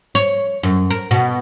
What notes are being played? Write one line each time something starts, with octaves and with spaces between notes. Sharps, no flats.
C#5
F#2
A#4
B2